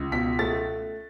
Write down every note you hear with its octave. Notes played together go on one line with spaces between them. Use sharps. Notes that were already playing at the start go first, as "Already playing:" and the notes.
Already playing: C#2
B2 B6
A3 A6